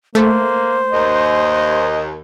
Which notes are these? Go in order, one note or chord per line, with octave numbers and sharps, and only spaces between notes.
A3 A#3 C5
D#2 D#5